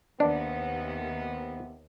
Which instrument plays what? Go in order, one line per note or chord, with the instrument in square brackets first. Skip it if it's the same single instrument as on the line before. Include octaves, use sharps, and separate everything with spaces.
[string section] D#2 [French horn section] C3 B3 [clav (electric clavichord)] D4